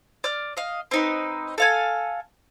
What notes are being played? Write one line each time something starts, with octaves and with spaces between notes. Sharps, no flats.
D5 F6
D#5 F5
C4 D#4 B4
A4 F5 G#5